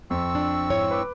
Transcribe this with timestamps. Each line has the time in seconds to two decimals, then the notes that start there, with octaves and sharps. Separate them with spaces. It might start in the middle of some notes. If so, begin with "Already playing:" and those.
0.10 F2 C4 C#6 E6
0.35 D4
0.70 G#2 E4 C#5
0.91 B4 D6